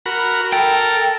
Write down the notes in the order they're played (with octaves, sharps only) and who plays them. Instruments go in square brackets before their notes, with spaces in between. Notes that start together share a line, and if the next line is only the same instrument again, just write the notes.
[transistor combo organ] F#4 A#4 B5
[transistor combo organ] A4 A#4 [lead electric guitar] G5